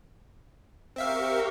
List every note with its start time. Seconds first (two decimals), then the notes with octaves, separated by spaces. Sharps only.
0.96 C4 G4 A#4 E5 F5 C#6